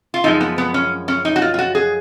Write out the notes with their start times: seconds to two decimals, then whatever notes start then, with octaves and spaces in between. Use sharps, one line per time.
0.14 F4
0.24 F#2 F3 G#3 D#4
0.41 B3
0.58 B3
0.74 C#4
1.08 C#4
1.25 D#4
1.36 F#4
1.42 F4
1.54 F4
1.59 F#4
1.75 G#4